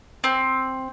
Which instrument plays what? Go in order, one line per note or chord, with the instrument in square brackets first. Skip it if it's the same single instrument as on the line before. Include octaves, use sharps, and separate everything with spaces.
[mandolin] C4